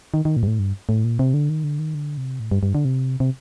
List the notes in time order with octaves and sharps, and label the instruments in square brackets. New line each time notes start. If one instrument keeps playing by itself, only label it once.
[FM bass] D#3
D#3
A#2
G2
A2
G2
A2
A#2
C3
D3
D#3
D3
D#3
D3
C3
A2
G2
G2
D3
C3
C3